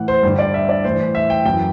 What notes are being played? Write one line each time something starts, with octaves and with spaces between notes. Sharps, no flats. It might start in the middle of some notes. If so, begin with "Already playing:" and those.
Already playing: A2 E3 F#5
C5
G2 D3
D5
E5
D5
A2 E3 C5
E5
G5
F#2 E3 G5